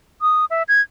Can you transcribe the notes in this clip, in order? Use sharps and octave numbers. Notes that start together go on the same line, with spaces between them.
D#6
E5
G#6